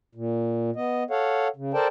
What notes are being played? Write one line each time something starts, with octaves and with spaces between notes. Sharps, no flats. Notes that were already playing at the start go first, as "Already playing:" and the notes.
A#2
B3 D#5
A4 C#5 F5 F#5
C#3
A4 A#4 C5 D5 G5 A5